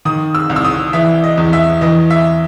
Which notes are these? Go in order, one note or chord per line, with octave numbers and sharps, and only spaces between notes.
D#3 D#6
E6
C2
E6
D#6
E3 E5
D#5
E2
E5
E3 D#5
E5